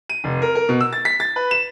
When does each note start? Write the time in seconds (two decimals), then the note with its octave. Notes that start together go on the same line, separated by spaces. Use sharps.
0.10 D#7
0.24 F1
0.42 A#4
0.55 A#4
0.69 B2
0.81 E6
0.93 A6
1.05 B6
1.20 A6
1.36 B4
1.51 E7